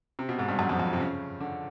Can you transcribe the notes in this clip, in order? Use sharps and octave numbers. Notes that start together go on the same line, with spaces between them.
C3
B2
G#2
G2
F#2
F2
F2
C3
C#3
D3